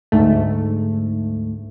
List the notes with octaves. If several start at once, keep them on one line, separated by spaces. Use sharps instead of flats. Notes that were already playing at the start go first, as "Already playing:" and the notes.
D2 G#2 A3